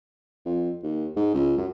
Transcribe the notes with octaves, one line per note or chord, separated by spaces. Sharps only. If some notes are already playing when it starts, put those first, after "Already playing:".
F2
D#2
G#2
C#2
F#2